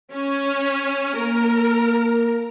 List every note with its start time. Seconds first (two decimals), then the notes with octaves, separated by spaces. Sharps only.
0.13 C#4
1.18 A#3 A#4